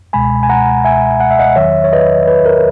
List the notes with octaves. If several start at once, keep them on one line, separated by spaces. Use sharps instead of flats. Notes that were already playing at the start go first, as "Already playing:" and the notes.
C#2 B2 G#3 G#5 B5
G#5
F#5 A#5
E5 G#5
F#5
E5
D#5 F#5
E2 D#3 F#3 C#5 E5
C#5
B4 D#5
B4
A#4